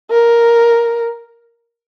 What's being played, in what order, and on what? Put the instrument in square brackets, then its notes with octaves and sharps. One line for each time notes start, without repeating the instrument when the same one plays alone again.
[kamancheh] A#4